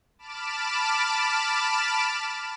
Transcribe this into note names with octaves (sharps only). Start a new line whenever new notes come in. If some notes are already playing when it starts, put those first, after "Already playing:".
A5 B5 D6 F6 D7 E7